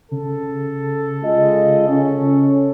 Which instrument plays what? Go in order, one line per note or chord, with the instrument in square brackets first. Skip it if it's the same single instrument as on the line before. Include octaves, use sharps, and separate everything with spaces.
[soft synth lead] C#3 [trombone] A4
[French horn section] G#3 F4 D#5
C#4